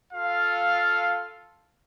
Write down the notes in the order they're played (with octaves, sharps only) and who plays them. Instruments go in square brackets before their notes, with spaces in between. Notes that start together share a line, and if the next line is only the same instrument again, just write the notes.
[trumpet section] F4 A4 F5